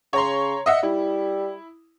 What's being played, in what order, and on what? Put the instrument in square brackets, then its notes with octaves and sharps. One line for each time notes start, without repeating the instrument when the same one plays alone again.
[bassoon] C#3 [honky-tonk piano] C#5 A#5 C6
[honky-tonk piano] D#5 E5 F#5
[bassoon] G3 [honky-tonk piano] E4